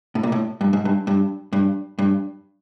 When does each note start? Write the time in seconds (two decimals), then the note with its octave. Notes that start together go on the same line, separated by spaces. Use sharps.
0.15 A2
0.23 A#2
0.32 A2
0.61 G2
0.73 G#2
0.85 G2
1.07 G2
1.53 G2
1.99 G2